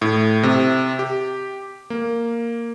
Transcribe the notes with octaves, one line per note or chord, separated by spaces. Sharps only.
A2
C3
G4
A#3